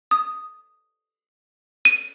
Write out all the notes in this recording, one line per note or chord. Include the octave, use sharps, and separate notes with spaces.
D#6
D#7